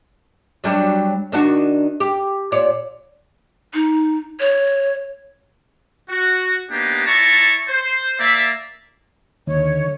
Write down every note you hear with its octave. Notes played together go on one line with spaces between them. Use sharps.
F#3 G3 D4
D#3 D4 F#4
G4
A#2 C#5 D5
D#4
C#5
F#4
A#3 B3 D4 D#4 G4
E4 D5 A5 A#5 C#6
C5
A#3 D5 E5
D#2 D3 D#3 C#5